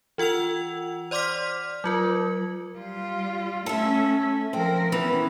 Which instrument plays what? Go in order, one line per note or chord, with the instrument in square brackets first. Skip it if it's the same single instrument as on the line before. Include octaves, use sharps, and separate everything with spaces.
[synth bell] E3 F4 F#5 E6 F7
C5 D5 C6 D6 F6 B6
F#3 F4 A#4
[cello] G3 F4
[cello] A3 C#4 [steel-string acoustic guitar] A4 E5
[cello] F3 A#4 [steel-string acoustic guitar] C4
[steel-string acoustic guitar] E3 [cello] B3 C#4